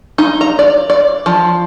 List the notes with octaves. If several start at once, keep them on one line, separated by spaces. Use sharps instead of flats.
D#4
A#5
D5
D5
F3